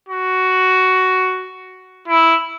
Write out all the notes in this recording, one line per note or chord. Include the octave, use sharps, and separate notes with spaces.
F#4
E4